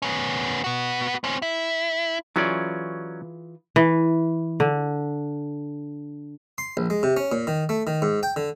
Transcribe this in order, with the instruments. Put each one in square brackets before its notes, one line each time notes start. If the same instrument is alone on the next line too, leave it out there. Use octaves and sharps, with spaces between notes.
[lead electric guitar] B3 C#4
B3 F#4
C4 C#4
E4
[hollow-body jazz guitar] E3 F4 G#4 [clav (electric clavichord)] F#3 C#4 D5
[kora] E3
D3
[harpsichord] C6
A#1
G#3
C3
C#4
A#2
D#3
A3
D#3
G#2
G5
D3